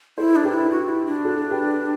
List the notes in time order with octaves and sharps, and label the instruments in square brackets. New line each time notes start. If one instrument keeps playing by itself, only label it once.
[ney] E4 [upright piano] A4 C5
[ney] D4
[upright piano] G4 B4
[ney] E4
F#4
E4
D4
[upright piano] F#4 A4
G4 B4